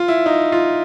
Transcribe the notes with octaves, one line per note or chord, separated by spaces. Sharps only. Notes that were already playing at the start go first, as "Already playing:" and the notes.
Already playing: F4
E4
D#4
F4